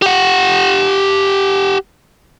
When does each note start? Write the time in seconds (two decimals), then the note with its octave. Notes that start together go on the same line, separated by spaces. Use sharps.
0.02 G4 F#5